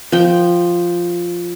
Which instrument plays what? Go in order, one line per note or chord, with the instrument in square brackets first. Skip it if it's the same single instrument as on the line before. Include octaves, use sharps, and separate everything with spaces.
[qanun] F3 G5